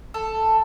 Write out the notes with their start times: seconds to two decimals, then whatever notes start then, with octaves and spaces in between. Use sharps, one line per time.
0.14 A4